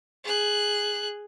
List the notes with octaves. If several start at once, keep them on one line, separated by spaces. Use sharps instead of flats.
G#4 F#6